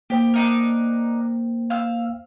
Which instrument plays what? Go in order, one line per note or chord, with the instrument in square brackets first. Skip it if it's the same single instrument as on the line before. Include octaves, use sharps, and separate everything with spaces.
[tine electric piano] A#3 C5 G5 [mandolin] G4
[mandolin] D4 D#4 A#4
F5 E6